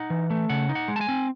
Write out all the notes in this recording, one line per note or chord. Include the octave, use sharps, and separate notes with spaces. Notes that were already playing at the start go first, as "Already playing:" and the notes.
Already playing: D#4 F#5
E3
A3
C#3 F#5
D#4
F#5
G#3
A5
G#5
C4